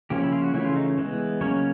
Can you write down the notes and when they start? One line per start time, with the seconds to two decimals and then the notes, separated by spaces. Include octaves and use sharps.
0.10 C#3 F3 A#3 C#4 G4
0.24 E4
0.32 F4
0.44 F#4
0.54 C#3 E3 A3 C#4 E4
0.65 F4
0.76 D#4
0.98 E3 G#3 B3
1.41 C#3 F#3 A#3 C#4 C#5